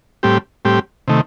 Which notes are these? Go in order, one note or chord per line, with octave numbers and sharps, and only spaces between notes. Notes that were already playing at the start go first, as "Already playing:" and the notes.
A2 G3 C4 G4
A2 G3 C4 G4
C3 D#3 A3